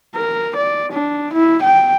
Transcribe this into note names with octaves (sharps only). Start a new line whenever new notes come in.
A#4
D5
D4
E4
G5